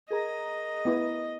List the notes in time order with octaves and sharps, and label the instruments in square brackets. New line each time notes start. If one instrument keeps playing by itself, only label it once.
[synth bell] G#4 A#4 A#5 [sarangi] D#5
[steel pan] B3 E4